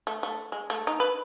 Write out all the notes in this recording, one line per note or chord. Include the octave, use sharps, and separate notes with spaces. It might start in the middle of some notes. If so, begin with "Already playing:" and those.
A3
A3
G#3
A3
D#4
B4